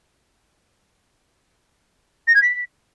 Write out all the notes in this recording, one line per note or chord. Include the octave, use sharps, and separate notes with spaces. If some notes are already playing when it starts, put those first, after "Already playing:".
A#6
G#6
B6